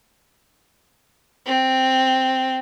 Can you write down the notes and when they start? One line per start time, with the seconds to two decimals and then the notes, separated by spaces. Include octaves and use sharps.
1.46 C4